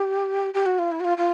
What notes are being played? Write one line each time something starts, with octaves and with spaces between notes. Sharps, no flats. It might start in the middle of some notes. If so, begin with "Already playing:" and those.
Already playing: G4
G4
F#4
F4
E4
F#4
F4
F4